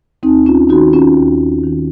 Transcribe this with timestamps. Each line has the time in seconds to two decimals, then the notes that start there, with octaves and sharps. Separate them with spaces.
0.23 D#2 C4 D#4
0.46 C#4 F4
0.69 D#3 D#4 F#4
0.93 C#4 F4
1.17 D#2
1.64 D#3